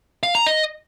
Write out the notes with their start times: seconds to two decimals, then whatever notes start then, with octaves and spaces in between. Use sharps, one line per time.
0.23 F5
0.35 A#5
0.47 D#5